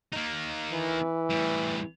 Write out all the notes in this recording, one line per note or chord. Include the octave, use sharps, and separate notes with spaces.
A#3 D#4
E3
A2 G3